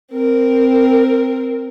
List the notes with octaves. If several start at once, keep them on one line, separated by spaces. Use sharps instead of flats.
C4 A#4